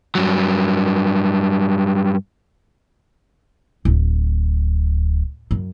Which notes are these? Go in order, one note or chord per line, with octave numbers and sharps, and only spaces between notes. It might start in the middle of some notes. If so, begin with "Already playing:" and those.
G2 F#3
D1
F#2